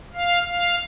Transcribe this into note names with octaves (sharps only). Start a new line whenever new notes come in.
F5
F5